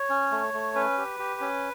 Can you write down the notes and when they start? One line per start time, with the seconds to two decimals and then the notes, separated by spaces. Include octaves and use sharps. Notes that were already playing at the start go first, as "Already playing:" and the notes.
Already playing: C#5
0.10 C#4
0.31 A3
0.54 A3
0.75 C#4 B4
0.98 G4
1.19 G4
1.41 C#4